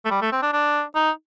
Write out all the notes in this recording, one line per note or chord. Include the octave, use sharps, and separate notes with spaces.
A3
G3
A3
C4
D4
D4
D#4